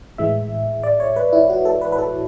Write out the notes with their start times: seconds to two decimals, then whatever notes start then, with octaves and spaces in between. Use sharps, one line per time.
0.18 A2 E3 G#3 E5
0.84 D5
1.00 C#5
1.16 B4
1.33 E4
1.50 F#4
1.65 A4
1.81 B4
1.92 B4
1.98 A4